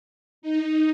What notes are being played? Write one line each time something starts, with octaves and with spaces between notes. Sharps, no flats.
D#4